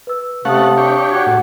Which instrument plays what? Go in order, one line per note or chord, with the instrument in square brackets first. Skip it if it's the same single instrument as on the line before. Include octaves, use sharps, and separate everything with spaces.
[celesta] B4 E6
[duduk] C3 [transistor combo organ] A3 C#4 F#5 [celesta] F5 A5 D#6
[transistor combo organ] D4 G4 C#5
[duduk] F#4 [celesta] G#6
[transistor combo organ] A2